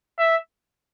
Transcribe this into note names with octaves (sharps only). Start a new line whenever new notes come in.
E5